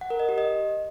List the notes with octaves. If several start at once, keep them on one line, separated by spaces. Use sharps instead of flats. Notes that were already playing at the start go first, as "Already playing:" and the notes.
F#5
A#4
D#5
G4
D#5